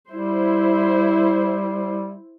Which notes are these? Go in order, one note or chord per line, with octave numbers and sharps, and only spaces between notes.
G3 E4 C5